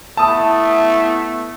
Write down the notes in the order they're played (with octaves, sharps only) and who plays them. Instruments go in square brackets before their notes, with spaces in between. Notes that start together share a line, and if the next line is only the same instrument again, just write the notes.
[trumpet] A3 [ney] B3 [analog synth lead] E4 [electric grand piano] A5 D#6